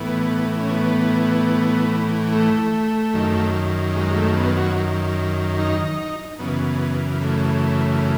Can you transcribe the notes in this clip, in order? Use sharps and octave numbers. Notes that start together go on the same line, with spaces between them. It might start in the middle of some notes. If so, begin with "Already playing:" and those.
Already playing: A2 E3 B3
C#4
B3
A3
F#2 D#3
G#3
A3
B3
F#4
D#4
F#2 C#3 E3 B3
A3